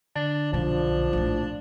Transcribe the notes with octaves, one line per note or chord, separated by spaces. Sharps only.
D3 D4
B1 A#2 F3 D4
A#1 A2